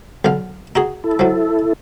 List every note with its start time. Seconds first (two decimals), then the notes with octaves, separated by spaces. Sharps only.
0.25 B1 D3 F5
0.76 D#4 F#4 G#4
1.04 E4 A4
1.19 F3 F#3